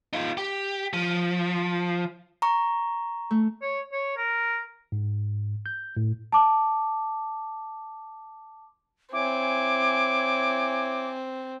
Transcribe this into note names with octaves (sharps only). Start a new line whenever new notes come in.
D#4 F4
G4
F3
A#5 C#6
A3
C#5
C#5
A#4
G#2
G6
A2
A5 D6
C4 E4 C#5 G#5 D6